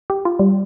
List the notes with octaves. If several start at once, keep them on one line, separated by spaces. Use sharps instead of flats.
G4
F4
G3